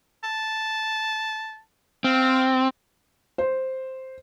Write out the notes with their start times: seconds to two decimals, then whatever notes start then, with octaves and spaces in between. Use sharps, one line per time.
0.24 A5
2.04 C4 F5
3.38 C5